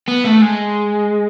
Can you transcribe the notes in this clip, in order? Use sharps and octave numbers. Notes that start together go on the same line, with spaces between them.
B3
A3
G#3